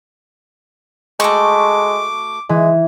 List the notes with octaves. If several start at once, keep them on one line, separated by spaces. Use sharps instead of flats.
G#3 A3 F#4 C#6 D6
E3 G#3